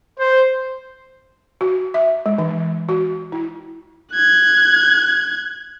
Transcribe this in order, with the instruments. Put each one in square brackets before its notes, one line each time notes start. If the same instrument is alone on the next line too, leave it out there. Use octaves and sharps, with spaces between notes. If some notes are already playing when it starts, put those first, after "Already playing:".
[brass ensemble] C5
[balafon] F#4
E5
G#3
E3
F#4
E4
[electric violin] F#6 G#6